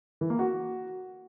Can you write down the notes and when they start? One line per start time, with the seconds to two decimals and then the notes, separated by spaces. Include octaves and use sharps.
0.21 E3
0.30 A#3
0.39 F#4